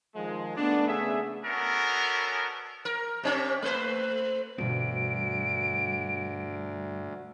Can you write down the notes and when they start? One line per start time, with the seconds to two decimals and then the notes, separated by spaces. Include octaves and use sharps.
0.14 D#3 F3 G#3
0.56 A3 B3 D4
0.87 C#3 G#4 E5
1.44 B3 C#4 D4 F#4 A4 A#4
2.85 A#4
3.23 C3 C4 C#4
3.62 A3 B4 C5
4.58 D2 G2 B2 E3 D7